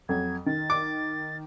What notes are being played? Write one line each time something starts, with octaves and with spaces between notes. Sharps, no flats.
F2 F#3 G#6
D#3 A6
D6